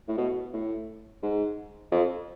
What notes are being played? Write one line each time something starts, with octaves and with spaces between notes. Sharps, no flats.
A2
B2
A2
G#2
F2